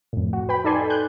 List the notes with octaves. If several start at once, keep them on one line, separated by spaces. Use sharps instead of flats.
F2 A2
F#4
B4 G5 B5
D#4 A4 D5 G#5 C6
F#6 G6